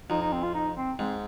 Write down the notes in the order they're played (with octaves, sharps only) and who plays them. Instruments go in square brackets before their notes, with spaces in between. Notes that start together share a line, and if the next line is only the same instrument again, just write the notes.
[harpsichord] F2 [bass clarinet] D#4
[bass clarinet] D#4
C4
F4
D#4
C4
[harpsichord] G#2 [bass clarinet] C4